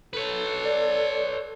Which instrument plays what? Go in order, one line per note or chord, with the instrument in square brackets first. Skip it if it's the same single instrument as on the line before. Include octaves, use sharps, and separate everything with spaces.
[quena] A4 [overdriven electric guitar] B4 C#5
[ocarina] D5